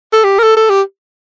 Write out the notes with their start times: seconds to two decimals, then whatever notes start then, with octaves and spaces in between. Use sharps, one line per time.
0.13 A4
0.24 G4
0.39 A#4
0.43 A4
0.56 A4
0.70 G4